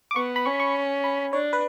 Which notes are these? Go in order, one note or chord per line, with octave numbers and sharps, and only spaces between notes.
D6
B3 C#6
B5
C#4 C#6
C#6
B5
D4 C#5
B4